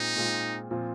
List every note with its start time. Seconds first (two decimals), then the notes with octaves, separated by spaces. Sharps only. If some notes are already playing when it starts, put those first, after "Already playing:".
Already playing: A#2 G#3 C4 D#4 F4
0.16 A#2 G#3 C4 F4
0.71 A#2 F3 C4 F4